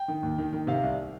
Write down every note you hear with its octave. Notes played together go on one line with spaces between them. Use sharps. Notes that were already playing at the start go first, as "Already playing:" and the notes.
Already playing: G5
D#3
D#2
D#3
D#3
C3 F5
C2